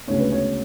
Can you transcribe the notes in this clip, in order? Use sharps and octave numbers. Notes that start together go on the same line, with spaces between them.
D2 C#3 G#3 B3 C#5
B4
C#5